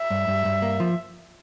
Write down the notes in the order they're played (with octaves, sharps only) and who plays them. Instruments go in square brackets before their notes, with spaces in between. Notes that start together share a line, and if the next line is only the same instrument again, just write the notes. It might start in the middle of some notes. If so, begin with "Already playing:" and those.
Already playing: [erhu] E5
[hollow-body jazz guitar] G2
G2
G2
A#3
F3